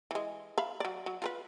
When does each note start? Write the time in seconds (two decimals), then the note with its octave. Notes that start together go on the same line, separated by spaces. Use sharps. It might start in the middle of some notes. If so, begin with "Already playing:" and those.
0.11 E3 G#3
0.58 E5 F5 B5
0.80 F#3 D5
1.06 F#3
1.22 F4 A#4 B4